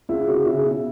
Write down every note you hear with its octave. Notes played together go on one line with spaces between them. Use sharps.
C#2 E4
C#3 F#4
C#3 E4
B2